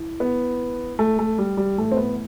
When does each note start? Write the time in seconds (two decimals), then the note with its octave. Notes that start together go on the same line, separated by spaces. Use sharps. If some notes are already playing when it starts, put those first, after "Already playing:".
Already playing: E3
0.20 B3
0.99 A3
1.19 A3
1.38 G3
1.57 G3
1.78 A2 E3 A3
1.92 C4
1.97 B3